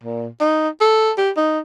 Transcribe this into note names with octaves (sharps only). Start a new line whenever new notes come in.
A#2
D#4
A4
G4
D#4